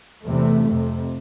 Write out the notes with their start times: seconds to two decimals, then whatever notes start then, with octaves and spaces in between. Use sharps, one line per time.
0.25 E2 C3 A3
0.66 F2 C3